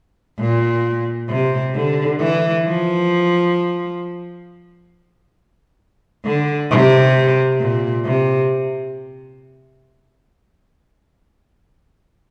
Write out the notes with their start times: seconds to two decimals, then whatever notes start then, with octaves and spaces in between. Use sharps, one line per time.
0.39 A#2
1.29 C3
1.74 D3
2.20 E3
2.65 F3
6.25 D3
6.70 C3
7.60 A#2
8.05 C3